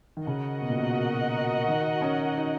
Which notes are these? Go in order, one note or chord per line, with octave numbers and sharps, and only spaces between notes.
D#3
C#3 F#4 A#4 D#5 F#5
B2
A#2
B2
D#3
C#4
D#4